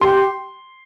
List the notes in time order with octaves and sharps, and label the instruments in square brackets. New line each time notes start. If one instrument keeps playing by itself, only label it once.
[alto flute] G4 [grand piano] C6